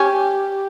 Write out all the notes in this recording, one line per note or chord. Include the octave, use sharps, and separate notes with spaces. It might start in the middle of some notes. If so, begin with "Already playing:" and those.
Already playing: C#4 G4